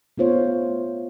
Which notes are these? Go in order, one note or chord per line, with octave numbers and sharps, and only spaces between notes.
A3 B3 F4 C5 C#5